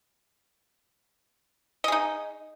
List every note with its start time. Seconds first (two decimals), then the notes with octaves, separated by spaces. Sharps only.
1.84 D#5
1.88 G#4
1.92 D#4